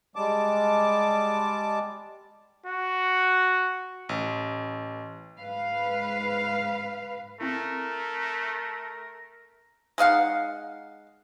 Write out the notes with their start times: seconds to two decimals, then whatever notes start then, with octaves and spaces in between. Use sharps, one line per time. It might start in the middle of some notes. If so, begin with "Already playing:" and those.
0.16 G3 G#3 A5 D6
2.66 F#4
4.09 A1
5.38 G#2 B4 F5
7.41 A3 C4 E4 A#4
9.98 G#3 D#4 F5 F#5